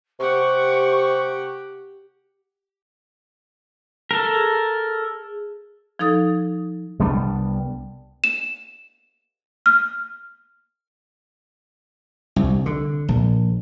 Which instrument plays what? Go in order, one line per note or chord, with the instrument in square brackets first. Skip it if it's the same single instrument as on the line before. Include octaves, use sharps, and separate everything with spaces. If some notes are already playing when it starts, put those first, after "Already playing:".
[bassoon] C3 [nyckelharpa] G4 F#5 [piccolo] C#6
[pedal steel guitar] A4 A#4
[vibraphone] G#4
[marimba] F3 D#4 A4 D#6 A6
[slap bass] C2 G3 B3 D4
[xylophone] E7
F6
[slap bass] C2
D3
A#1